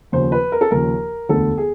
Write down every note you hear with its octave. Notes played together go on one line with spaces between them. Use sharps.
D#2 C#3 F3 C5
B4
A#4
A4
D#2 C#3 F3 A#4
E1 D2 D3 A4
G#4